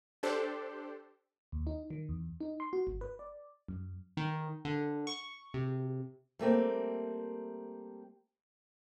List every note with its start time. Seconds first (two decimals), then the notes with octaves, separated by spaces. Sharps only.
0.23 D4 G4 A4 C5
1.52 D#2
1.67 D#4
1.90 D#3
2.09 E2
2.40 D#4
2.60 C6
2.73 F#4
2.87 G1
3.01 B4
3.19 D5
3.68 F#2
4.17 D#3
4.65 D3
5.07 C#6
5.54 C3
6.39 G3 A3 A#3 C4